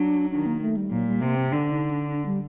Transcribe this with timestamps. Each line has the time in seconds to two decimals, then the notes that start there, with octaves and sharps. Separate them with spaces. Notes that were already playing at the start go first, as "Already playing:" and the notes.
Already playing: F#3 D4
0.31 D#3 D4
0.46 A#3
0.62 A3
0.77 G3
0.91 A#2 F#3
1.06 G3
1.21 C3 A#3
1.36 C4
1.51 D3 D4
1.71 D#4
1.91 D4
2.11 D4
2.26 G3